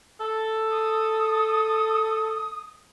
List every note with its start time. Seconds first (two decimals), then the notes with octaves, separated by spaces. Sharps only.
0.20 A4
0.70 D#6